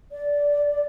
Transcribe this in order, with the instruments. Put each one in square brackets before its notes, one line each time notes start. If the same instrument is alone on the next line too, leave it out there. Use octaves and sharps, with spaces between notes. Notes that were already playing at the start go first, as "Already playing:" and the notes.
[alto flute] D5